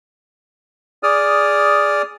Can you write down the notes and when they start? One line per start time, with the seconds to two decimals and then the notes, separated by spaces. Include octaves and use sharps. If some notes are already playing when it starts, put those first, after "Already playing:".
1.03 G#4 D5 D#6 F6